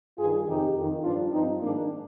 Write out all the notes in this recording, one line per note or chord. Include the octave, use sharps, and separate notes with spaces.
G2 D#3 F4 G#4
F2 C3 D#3 D#4 G4
F2 D#3
G2 F3 D4 F4
G2 F3 C4 D#4
G#2 D#3 A#3 D4